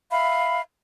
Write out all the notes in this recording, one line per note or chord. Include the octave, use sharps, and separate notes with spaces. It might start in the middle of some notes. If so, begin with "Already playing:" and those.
E5 F5 B5